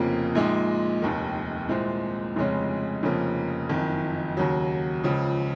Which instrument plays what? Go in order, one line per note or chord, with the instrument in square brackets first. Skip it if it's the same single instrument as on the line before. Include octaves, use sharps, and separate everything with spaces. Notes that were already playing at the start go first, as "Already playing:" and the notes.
Already playing: [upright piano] F1 F2 C#3 F3 A#3
A#1 A#2 G#3 D#4
F1 D#2 D#3
C2 A#2 G#3 C4
F1 F2 C#3 G#3 C#4
F1 F2 C#3 F3 A#3
F#1 F2 D#3
D#2 C#3 F#3
C#2 C#3 F3